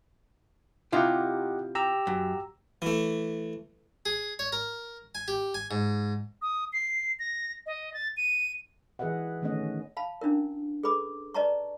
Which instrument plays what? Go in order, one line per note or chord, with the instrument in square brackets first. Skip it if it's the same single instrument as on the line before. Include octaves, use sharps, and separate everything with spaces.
[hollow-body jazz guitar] C3 E4 F4 [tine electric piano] G4 D#5 F#5
[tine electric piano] G4 A#5 E6
[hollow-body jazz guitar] F#2
[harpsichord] E3 A3
G#4
C#5
A#4
G#5
G4
G#5
G#2
[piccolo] D#6
C7
A#6
D#5
A6
D#7
[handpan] E3 G#4 B4 D#5 E5 F#5
D3 D#3 A3 B3 C#4 D#5
[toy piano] F5 A5 B5
C#4 D4 E4 A#4
G#4 A4 B4 B5 D6 D#6
B4 D5 D#5 A5 A#5 C#6